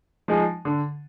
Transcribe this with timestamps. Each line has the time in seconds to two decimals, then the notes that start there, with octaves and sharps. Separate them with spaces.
0.28 F3 G#3 D#4 G#4
0.65 D3